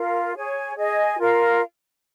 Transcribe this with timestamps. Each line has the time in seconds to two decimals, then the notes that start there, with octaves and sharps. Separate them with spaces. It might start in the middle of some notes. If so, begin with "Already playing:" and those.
Already playing: F4 A#4 F5
0.35 G#4 C#5 G#5
0.77 G#4 D#5 G#5
1.19 F4 A#4 F5